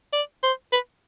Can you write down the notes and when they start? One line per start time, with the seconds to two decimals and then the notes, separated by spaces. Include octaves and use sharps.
0.13 D5
0.43 C5
0.73 B4